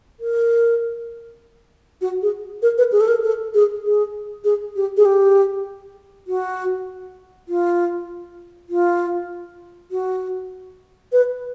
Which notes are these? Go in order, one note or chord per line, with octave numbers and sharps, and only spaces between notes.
A#4
F#4
G#4
A#4
B4
G#4
A4
A#4
A4
G#4
G#4
G#4
G4
G#4
G4
F#4
F4
F4
F#4
B4